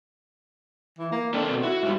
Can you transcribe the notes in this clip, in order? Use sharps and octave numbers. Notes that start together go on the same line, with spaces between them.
E3
A#3
C4 D4 A4 A#4
B2
E4 F#4
G#2 G3 E4